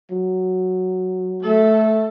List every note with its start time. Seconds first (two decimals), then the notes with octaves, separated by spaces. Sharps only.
0.11 F#3
1.43 A3 A4